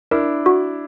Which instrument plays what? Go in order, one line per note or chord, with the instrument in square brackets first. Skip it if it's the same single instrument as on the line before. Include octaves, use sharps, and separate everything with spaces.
[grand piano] D4 E4 [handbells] A#4
[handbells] F#4